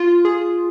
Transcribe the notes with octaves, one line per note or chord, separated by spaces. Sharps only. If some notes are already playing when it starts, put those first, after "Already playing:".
Already playing: F4
G#4